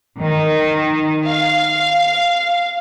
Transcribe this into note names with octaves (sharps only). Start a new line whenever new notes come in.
D#3
F5